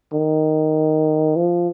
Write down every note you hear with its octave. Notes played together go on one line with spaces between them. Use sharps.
D#3
F3